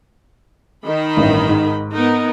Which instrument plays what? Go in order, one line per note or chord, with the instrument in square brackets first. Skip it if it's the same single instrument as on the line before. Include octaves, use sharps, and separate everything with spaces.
[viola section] D#3 D#5 B5
[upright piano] A1 G2
G#2
[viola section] B3 D#4 A#4